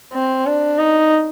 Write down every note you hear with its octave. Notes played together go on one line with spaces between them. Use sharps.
C4
D4
D#4